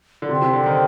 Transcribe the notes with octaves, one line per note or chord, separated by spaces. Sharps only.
D3
C3 C5 G5 C6
C3
D3
D#3